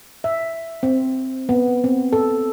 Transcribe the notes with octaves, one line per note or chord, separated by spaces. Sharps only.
E5
C4
B3
C4
A4